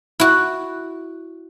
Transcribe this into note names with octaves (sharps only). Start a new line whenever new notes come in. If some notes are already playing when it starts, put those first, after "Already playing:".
E4 F#4